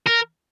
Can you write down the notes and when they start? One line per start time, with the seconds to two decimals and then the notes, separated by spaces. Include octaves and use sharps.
0.06 A#4